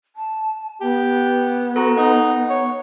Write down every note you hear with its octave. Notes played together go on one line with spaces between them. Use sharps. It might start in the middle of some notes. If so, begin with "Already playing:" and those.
A5
B3 G4
F#4 A4 A#5
D#4 F#5
C#5